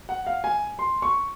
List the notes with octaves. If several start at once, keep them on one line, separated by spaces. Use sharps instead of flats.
F#5
F5
G#5
C6
C#6